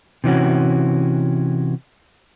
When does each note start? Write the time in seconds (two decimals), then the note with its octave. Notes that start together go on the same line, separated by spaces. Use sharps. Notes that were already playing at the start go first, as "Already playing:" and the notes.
0.24 C3 E3 C#4 F#4